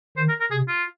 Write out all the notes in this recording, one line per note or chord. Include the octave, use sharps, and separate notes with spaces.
D#3 C5
A#4
A#4
C3 G#4
F4